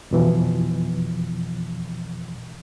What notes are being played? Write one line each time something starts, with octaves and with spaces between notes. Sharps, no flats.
F2 B2 E3 F3